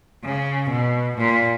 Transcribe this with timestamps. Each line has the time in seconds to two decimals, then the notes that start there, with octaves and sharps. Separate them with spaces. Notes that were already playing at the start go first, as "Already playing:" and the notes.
0.24 C#3
0.70 B2
1.18 A#2